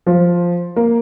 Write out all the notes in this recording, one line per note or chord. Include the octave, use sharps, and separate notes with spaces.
F3
A#3